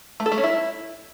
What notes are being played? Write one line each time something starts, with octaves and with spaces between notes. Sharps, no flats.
A3
A4
A3
C#4
E4